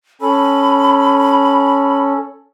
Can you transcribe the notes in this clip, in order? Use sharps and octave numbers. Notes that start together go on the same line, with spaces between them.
C#4 A4 B5